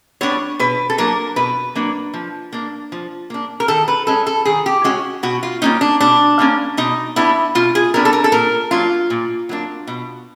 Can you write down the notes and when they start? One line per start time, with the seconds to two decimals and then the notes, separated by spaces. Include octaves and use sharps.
0.21 G3 B3 D4 C#5
0.59 B2 B4
0.90 A4
0.98 F#3 A#3 D4 A#4
1.36 B2 B4
1.75 F#3 A#3 D4
2.14 F3
2.52 A#3 D4
2.92 F3
3.30 A#3 D4
3.60 A#4
3.68 D#3 A4
3.88 B4
4.07 G#3 C#4 A4
4.27 A4
4.45 D#3 G#4
4.66 G4
4.84 G#3 C#4 F#4
5.23 B2 F#4
5.43 F4
5.62 G3 A#3 C#4 D#4
5.81 D4
6.01 B2 D4
6.39 G3 A#3 C#4
6.77 B2 D#4
7.16 G3 B3 D4 E4
7.55 B2 F4
7.75 G#4
7.94 G3 B3 D4 A#4
8.05 A4
8.13 A#4
8.24 A4
8.32 A#2 A#4
8.71 F#3 A#3 D4 F4
9.10 A#2
9.49 F#3 A#3 D4
9.87 B2